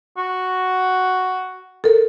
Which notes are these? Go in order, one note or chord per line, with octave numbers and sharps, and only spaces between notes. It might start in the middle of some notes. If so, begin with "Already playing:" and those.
F#4
A4 A#4